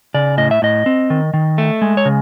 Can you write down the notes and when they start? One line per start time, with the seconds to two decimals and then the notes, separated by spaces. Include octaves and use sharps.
0.14 C#3 D5
0.38 A2 D#5
0.51 E5
0.62 A2 D#5
0.86 C4
1.10 D#3
1.34 D#3
1.58 A3
1.82 G#3
1.97 C#5
2.05 C#3